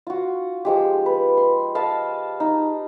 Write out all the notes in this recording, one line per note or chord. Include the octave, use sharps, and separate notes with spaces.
F4 F#4
F3 G#3 G4
B4
C6
D#5 F5 A5 B5
D#4